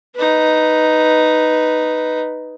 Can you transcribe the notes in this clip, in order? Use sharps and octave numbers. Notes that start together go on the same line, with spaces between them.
D#4 B4